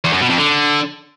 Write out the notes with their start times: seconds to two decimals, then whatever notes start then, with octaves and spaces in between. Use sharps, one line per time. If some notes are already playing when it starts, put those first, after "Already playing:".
0.05 E2
0.13 F#2
0.21 B2
0.30 F2
0.38 D3